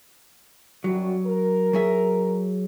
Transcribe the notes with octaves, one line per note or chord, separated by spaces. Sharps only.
F#2 F#3 G3 F#4
A#4
F#3 G#4 E5